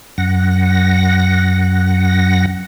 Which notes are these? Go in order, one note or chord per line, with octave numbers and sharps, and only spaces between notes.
F#2 F#5 A#6